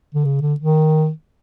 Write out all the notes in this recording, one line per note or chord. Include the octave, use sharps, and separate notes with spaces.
D3
C#3
D3
D#3